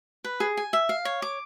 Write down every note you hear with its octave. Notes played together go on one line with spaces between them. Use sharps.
B4
G#4
G#5
E5
F5
C#5
D6